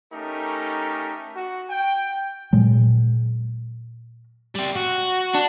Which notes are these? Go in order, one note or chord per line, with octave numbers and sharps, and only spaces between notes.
A3 C#4 D#4 G4 A4 A#4
F#4
G5
A#2 F#3 G#3
G3 C4
F#4
D4